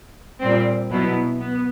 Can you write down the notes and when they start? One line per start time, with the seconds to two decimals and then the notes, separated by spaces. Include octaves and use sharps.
0.40 A#2 G3 C4
0.90 B2 F#3 B3 E4
1.41 B3